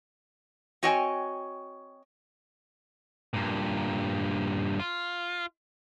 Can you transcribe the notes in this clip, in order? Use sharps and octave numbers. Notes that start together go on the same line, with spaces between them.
C4 F#4 C#5 D#5 G5 G#5
G2 A#2
F4